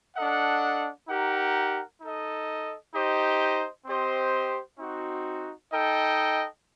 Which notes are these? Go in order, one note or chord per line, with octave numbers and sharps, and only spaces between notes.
D4 A4 D#5 F#5
D#4 G4 A#4 F#5
D#4 A4 D#5
D#4 G4 C5 D#5
C4 G4 C5 D#5
C4 D#4 F#4
D#4 A4 D#5 G5